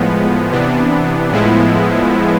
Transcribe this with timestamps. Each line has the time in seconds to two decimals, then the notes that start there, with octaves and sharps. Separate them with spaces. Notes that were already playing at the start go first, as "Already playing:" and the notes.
Already playing: A2 F3 G#3 B3
0.51 C3 E3 B3 D4
1.32 A2 F3 G#3 B3 E4